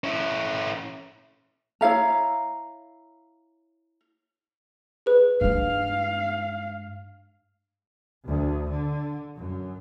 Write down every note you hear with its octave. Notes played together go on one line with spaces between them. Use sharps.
C#4 E4
E4 C#5 F5 A#5
G#4 B4
G2 G#3 F5
D2
D3
F#2